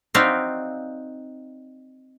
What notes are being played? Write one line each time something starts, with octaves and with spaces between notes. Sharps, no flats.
C4 D#4 F#4 D5 E5 F5